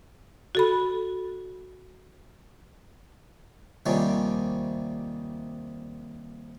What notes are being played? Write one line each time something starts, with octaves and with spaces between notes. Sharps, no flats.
F#4 A4 B5
D#2 C3 D#3 F3 G3 C#4